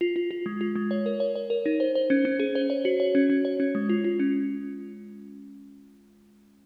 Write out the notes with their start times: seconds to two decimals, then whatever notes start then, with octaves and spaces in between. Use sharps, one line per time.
0.01 F4
0.16 F4
0.31 F4
0.46 G#3
0.61 F4
0.75 G#3
0.91 C#5
1.06 A#4
1.20 C#5
1.35 C#5
1.50 A#4
1.66 D#4
1.80 C5
1.95 C5
2.10 C#4
2.25 C#4
2.40 G#4
2.55 C5
2.70 C#5
2.85 F#4
3.00 C#5
3.15 C#4
3.29 C#4
3.45 C#5
3.60 C#4
3.75 G#3
3.89 F4
4.04 F4
4.19 C#4